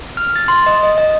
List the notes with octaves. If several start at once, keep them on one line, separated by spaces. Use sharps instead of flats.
F6
A6
C6
D#5
D#5
D#5